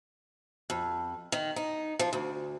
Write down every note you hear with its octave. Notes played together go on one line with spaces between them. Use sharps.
F2
D#3
D#4
F3
D2